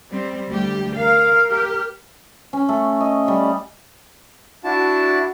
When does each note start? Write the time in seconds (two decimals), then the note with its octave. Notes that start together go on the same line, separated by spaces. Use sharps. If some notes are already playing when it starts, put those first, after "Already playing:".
0.13 G3 C4
0.49 D2 G3 G4
0.97 A#4 F5
1.51 G4
2.53 C#4
2.69 A3
3.00 D#5
3.28 G3
4.64 D4 E4 F#4 A5